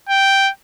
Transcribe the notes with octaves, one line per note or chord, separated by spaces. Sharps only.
G5